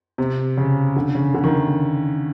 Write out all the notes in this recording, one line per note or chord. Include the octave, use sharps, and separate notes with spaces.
C3
C#3
D3
C#3
D3
D#3